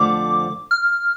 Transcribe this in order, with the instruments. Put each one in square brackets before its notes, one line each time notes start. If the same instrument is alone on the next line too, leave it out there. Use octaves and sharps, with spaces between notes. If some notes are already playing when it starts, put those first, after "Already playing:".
Already playing: [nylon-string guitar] F2 D3 F3 A3 [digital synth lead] D6
[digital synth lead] F6